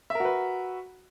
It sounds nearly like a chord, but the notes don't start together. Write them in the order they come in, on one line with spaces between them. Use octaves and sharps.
E5 A#4 F#4 B4